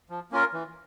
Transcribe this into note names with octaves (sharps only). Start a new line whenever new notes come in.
F3
A#3 C#4 F4 A#4
E3